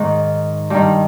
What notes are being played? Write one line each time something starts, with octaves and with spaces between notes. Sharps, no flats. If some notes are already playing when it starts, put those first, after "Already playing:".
Already playing: G#2 D#3
G2 D#3 G4